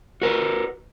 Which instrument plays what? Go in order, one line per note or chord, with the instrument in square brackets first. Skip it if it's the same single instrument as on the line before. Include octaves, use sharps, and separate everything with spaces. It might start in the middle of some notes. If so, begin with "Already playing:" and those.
[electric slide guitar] F#4 A#4 B4